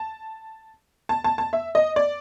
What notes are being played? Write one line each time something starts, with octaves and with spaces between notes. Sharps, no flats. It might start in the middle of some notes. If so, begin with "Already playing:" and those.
Already playing: A5
A5
A5
A5
E5
D#5
D5